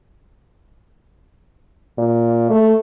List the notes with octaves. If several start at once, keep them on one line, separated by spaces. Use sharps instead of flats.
A#2
A3